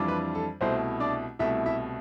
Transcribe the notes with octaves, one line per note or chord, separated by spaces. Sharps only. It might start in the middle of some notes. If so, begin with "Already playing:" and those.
Already playing: F2 E3 G3 D4 F4
B4
A4
C2 B2 A3 C4 E4 C5
D4 D5
C2 B2 A3 E4 E5
E4 E5